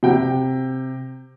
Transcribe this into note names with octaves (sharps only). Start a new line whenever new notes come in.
C3 G5